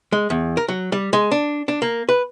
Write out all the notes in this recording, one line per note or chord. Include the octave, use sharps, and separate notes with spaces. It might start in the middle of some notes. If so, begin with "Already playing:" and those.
G#3
E2
A#4
F#3
G3
G#3
D4
D4
A#3
B4